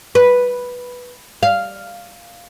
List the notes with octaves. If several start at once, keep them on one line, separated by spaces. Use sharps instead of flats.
B4
F5